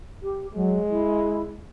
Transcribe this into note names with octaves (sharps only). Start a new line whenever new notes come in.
G4
F#3 G#3
E4